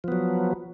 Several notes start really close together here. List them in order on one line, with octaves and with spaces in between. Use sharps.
F3 B3 F#3